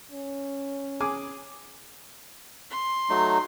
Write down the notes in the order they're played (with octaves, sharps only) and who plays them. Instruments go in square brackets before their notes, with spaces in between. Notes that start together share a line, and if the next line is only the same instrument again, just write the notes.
[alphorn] C#4
[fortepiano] G#4 G#5 D6
[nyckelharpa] C6
[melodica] F#3 A3 D#4